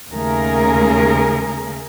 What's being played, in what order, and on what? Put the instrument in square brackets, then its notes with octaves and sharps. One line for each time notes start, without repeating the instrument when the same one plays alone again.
[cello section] D#2 C#3 A3 G#4 A#4